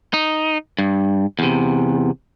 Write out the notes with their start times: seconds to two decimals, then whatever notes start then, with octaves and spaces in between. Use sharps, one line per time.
0.14 D#4
0.79 G2
1.39 E2 C3